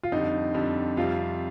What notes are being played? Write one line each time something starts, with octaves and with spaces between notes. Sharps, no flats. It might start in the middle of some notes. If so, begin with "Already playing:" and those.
F4
F2 D3 G3 D#4
F2 D3 G3
F2 C3 G3 F4